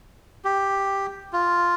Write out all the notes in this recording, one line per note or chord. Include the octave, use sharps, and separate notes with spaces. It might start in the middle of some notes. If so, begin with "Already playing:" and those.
G4
F4